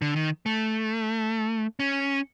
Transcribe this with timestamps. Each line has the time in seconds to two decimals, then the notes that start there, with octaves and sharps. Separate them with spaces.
0.02 D3
0.16 D#3
0.46 A3
1.80 C#4